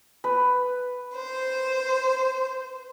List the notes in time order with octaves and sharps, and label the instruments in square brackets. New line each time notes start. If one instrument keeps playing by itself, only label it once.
[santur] B4 B5
[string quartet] C5